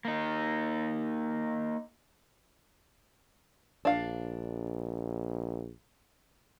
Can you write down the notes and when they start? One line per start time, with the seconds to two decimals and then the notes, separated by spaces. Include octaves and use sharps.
0.05 A#3 D#4
3.85 A#1 D4 F5